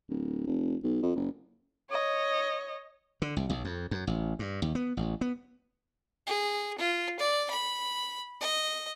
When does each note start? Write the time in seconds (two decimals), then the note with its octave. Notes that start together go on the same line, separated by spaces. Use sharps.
0.10 D1
0.47 F1
0.83 B1
1.03 F2
1.16 F#1
1.90 C#5 D#5
3.22 D3
3.37 C2
3.50 B1
3.65 F2
3.91 F#2
4.07 A1
4.39 G2
4.62 D#2
4.75 B3
4.97 A1
5.21 B3
6.26 G#4
6.78 F4
7.19 D5
7.50 B5
8.41 D#5